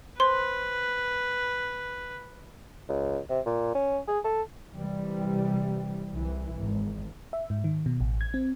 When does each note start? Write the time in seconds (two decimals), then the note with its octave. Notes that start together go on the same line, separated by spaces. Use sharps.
0.20 B4 C5 C6
2.89 C#2
3.29 C3
3.46 A#2
3.75 C#4
4.08 G#4
4.24 A4
4.74 C3 E3 G3
6.14 C2 E3
6.57 G#1
7.33 E5
7.50 G#2
7.64 D#3
7.86 B2
8.00 A1
8.21 G#6
8.34 C4